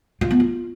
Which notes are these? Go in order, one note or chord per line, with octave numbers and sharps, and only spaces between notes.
F4
B3
F4